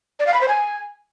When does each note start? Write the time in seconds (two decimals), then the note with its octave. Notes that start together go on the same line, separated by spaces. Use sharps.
0.20 D5
0.27 F5
0.34 B5
0.41 C5
0.48 G#5